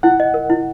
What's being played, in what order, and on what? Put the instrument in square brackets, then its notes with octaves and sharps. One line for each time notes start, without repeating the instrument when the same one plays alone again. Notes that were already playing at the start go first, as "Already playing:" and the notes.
[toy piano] E4 [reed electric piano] F#5
[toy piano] D#5
A#4
E4